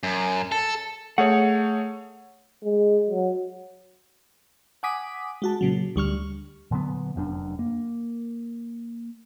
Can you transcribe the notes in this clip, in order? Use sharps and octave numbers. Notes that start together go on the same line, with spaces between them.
F#2
A4
A3 G#4 C#5 F#5
G#3
F#3
F#5 G#5 D6 D#6 B6
G#3 F#4 A5
A#2 C#3 F#3
D2 G3 C#6 F6
A#2 D3 F#3 B3
F1 F#2 D4
A#3